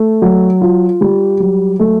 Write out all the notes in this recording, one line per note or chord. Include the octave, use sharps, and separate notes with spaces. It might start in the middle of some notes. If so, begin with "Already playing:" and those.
Already playing: A3
F#3
F4
G3
F#3
A3